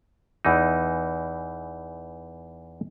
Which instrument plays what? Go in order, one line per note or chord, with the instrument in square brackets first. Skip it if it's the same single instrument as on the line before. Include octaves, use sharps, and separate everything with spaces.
[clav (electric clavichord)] E2 E3 D#4